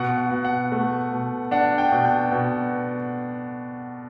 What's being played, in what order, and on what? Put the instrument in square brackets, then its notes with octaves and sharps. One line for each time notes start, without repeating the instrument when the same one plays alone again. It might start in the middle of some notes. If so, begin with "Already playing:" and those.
Already playing: [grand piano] B2 F#5
F#5
B2
F#5
A3
B2
D4 F#5
G5
B2
G5
B2